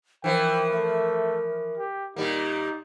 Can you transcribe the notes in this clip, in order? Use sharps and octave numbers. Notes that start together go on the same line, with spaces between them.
E3 F3 A#4 G5
A3
G4
A#2 G3 A#3 D#4